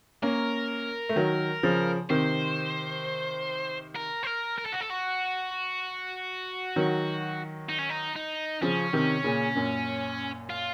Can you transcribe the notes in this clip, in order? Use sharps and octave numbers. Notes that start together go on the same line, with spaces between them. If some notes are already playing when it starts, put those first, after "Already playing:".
A#3 C#4 A#4
A3
D#3 F#3
C#3 F3
C3 D#3 C5
A#4
C5
A#4
A#4
A4
F#4
A4
F#4
D#3 F#3
D#4
C#4
D#4
D#4
C#3 F3 C#4
C3 D#3
A#2 C#3
F#2 A#2
F4